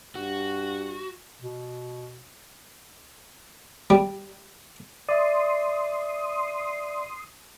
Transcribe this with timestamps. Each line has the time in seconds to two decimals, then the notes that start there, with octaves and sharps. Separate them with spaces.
0.15 G2 F#4
1.41 B2
3.90 G3
5.09 D5 E5 C6 D#6